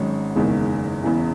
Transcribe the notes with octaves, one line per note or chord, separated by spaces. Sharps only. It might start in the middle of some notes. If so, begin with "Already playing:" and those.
Already playing: G#1 G#2 F#3 C#4
F#1 E2 D#3 G#3
E1 E2 C#3